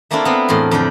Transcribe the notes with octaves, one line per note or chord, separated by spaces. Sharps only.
A3 A#3 C4 D4 E4 F4
B3 C4
E2 A2 A#4 C6
F2 D3 D5 G5